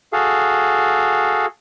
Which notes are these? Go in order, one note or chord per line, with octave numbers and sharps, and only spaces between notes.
F#4 G#4 A4 F5